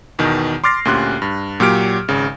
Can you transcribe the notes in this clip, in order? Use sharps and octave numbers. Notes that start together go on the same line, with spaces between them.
E2 B2 D#3
C6 D6 F6 A6 A#6 C7
D2 A#2 C#4 G4 C6 F#6
G2
A#2 F#3 G4 F6 D7
G#1 C#3